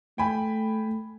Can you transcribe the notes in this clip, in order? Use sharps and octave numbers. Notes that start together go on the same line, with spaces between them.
A3 G5 G#5 B5